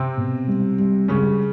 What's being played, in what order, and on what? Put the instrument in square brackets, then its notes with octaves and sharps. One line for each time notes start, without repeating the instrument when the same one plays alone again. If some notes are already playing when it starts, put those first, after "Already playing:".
Already playing: [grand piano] C3 C4
[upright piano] B2
G3
G3
[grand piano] C#3 C#4 [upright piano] G3